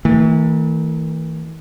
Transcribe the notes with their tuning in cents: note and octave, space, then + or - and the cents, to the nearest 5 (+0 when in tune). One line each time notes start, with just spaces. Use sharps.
E3 -35 A3 +40